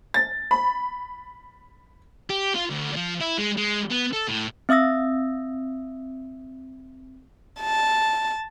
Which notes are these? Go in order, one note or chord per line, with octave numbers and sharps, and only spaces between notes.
A6
B5
G4
F4
D2
F3
E4
G#3
G#3
B3
A4
A2
C4 E5 D#6 E6 A#6
A5